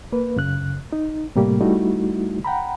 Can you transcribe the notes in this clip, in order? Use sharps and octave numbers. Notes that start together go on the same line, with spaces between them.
A#3 B4
F#2 C#3 F#6
D#4
A2 C3 G3 A3 A#3 G4
G3 A3 D#4 E4 F#4
F#5 G5 A#5 B5